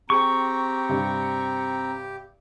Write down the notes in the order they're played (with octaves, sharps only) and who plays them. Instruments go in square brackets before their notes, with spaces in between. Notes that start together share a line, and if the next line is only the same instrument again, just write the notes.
[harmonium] C4 A#5 [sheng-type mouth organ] G4 [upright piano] G#4 G5 [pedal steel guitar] C#6
[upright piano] G2 C3